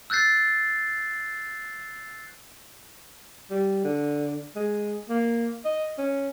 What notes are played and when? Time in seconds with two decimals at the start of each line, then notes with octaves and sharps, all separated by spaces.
0.10 E6 F#6 G6 A6 C7
3.51 G3
3.85 D3
4.56 G#3
5.09 A#3
5.65 D#5
5.98 C#4